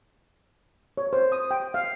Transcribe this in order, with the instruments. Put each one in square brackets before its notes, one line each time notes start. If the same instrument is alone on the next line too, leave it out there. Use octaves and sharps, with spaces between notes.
[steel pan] C#5
C5
D#6
G5
F5